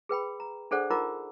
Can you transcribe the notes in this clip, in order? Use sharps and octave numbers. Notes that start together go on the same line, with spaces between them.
G#4 B4 G5 B5
A#5
D4 G#4 A4 C5 D5 F#5
D#4 F4 A#4 F#5 A#5 D6